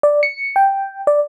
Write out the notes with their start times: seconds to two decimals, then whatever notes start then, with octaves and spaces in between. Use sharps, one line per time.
0.03 D5
0.23 C#7
0.56 G5
1.07 D5